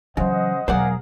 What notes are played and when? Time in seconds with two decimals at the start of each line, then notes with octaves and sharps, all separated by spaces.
0.17 C#3 E3 F#3 C5 D#5 F#5
0.68 E1 F#3 G#4 A#4 C5 D5 F5 F#5